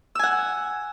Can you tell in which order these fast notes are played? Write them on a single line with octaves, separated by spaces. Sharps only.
E6 G#5 F#5